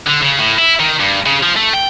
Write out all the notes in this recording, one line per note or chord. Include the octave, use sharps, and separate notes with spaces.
D3
C#3
A2
E4
D#3
G2
C#3
F3
A3
G5